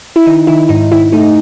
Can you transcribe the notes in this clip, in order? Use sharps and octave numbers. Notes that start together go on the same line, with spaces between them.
E4
D#3 D#4
D#3 E4
G#2 D#4
D#3 E4
A3 D#4